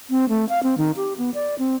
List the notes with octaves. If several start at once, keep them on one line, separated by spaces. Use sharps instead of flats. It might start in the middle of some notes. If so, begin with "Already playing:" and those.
C4
A3
F5
C4
D#3
G4
B3
D5
C4